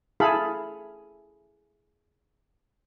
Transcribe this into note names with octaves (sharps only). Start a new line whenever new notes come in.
E4 G#4 A4 F5 B5